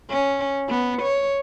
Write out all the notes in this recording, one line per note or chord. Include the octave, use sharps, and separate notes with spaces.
C#4
B3
C#5